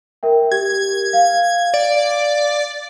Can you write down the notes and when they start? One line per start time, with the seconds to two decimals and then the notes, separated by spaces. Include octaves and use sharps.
0.23 A#4 E5 G5
0.52 G4 G#6
1.13 F5
1.74 D5